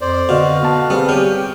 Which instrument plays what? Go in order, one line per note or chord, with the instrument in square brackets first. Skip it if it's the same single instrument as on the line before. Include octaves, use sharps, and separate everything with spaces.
[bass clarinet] F2 [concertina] C5 D5
[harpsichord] B2 [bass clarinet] D3 [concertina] F#4 F5
[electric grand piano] B3 A5
[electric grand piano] G3 C4 [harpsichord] B3 [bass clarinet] G#4
[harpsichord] C#4 [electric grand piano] G4 F6 [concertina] G5